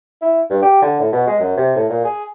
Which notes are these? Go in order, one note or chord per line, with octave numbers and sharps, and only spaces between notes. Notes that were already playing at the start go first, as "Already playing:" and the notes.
E4
G2
G4
D3
A2
B2
G#3
F#2
C3
A2
A#2
G#4